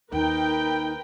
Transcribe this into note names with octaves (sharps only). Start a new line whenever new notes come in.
D#2 D#4 A#4 B4 G5